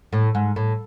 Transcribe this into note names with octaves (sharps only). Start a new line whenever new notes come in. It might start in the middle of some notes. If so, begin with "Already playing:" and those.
A2
G#2
A2